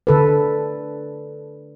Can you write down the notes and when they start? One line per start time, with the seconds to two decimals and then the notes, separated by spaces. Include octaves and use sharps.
0.07 D3 A4 B4